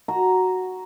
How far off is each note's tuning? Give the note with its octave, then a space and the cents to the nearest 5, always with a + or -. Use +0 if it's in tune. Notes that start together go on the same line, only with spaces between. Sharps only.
F#4 +0 A#5 +0